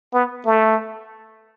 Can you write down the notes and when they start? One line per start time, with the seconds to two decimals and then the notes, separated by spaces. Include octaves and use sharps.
0.13 B3
0.46 A3